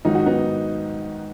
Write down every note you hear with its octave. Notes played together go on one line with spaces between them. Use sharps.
G#2 D#3 F#3 D#4
F#4
B3 D#4